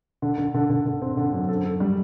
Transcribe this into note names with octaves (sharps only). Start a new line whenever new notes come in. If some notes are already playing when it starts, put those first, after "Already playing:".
D3
D3
D3
D3
D3
C4
D3
F#2
A4
A4
G3